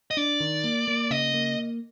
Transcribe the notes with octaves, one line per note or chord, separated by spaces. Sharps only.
D#5
D4 D5
D#3
A#3
A#3
C#3 D#5
A#3